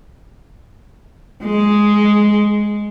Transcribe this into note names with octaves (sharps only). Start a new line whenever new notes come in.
G#3